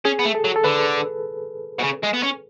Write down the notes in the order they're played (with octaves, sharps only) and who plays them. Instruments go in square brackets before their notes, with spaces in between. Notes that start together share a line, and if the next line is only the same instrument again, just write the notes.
[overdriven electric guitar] C#4 [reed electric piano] G#4
[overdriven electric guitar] B3
A3
[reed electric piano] A4
[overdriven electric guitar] F#3
[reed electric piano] A4
[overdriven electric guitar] D3 [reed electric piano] B4
[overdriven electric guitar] B2
C#3
G#3
B3
C#4